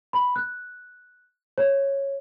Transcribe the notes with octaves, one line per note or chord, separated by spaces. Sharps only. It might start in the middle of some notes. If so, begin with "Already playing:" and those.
B5
F#6
C#5